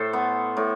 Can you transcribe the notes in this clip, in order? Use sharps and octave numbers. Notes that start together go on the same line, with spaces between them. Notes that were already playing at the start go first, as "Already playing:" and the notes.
Already playing: A2 A4 C5
B3
A2